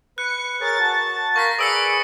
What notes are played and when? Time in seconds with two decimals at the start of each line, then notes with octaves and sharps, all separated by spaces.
0.18 B4 F#6 C#7
0.61 G#4 A#4 C#5 A6
0.79 F#4 A5
1.36 A#4 F5 C#6 G6 A#6 B6
1.59 G#4 B4 D5 D#6 E6 C#7 D7